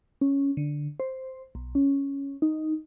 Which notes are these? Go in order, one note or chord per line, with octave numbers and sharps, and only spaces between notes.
C#4
D3
C5
B1
C#4
D#4